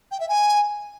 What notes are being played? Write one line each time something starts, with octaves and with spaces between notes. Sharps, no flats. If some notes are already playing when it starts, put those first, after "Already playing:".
G5
E5
G#5